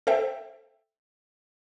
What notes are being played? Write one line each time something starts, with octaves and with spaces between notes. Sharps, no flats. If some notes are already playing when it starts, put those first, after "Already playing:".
A4 C5 E5 G5